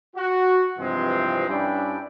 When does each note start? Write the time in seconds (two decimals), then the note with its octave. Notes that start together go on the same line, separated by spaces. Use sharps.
0.15 F#4
0.78 G2 C3 E3 F3 G#3 C4
1.48 G2 G3 C#4 D4 E4 G5